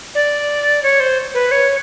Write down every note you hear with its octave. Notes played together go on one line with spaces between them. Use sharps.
D5
C#5
C5
B4
C#5